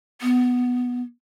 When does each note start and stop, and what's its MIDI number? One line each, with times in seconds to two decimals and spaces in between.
0.22 1.02 59